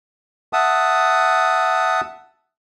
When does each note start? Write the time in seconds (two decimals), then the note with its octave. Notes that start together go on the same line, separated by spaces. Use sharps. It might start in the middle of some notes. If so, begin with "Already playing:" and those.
0.53 E5 F#5 A5 D#6